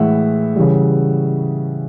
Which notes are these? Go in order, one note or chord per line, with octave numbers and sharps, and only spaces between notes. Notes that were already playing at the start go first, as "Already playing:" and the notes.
Already playing: A2 E3 G#3 E5 F#5
C#3 E3 G3